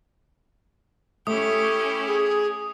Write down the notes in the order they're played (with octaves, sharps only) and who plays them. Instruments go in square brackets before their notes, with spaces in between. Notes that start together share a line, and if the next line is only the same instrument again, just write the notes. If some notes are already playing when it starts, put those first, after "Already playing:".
[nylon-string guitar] A3 [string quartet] C#4 E4 G4 [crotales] D#6
[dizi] G#4